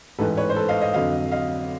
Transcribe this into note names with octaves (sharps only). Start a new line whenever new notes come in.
A1 G#2 E3 A4 B4
B4 C#5
C5
A4 B4
D#5 F5
D#5 F5
F2 D3 F#3 D#5 F5
D#5 F5